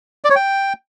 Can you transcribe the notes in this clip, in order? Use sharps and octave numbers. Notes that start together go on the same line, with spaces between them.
D5
C#5
G5